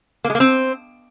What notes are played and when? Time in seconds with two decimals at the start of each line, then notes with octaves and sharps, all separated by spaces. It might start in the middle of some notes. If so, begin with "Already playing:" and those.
0.24 A#3
0.30 G#3
0.35 A#3
0.40 C4